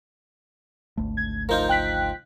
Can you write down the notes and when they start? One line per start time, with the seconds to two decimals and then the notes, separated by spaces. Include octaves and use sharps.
0.97 G#1 D2 A3
1.17 G#6
1.49 F3 D#4 F4 A#4 G6
1.69 G5 F#6 B6